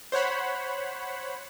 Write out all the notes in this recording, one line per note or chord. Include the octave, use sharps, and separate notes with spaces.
C5 C#5 F#5 B5